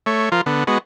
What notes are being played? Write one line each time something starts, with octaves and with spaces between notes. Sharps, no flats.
A3 C#5
F3 F4 A#4
D3 B3
G#3 B3 F#4